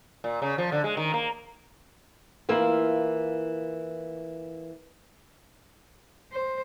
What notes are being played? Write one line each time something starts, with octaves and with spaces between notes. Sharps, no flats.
A#2
C#3
F3
D3
G#3
D#3
A#3
E3 A#3 E4 F4
C5